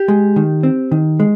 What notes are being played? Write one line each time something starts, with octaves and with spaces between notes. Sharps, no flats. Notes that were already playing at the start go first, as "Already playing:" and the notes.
Already playing: G4
G#3
D#3
C4
D#3
G#3